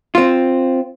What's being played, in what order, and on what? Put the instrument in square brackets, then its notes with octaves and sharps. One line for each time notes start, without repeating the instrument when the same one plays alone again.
[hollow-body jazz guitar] C4 F4